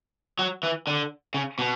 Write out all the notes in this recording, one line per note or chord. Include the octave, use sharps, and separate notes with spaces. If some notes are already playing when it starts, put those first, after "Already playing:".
F#3
E3
D3
C#3
B2